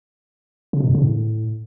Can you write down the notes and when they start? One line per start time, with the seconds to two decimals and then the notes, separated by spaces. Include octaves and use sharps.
0.73 C#3
0.80 B2
0.88 F#2
0.95 C#3
1.02 A2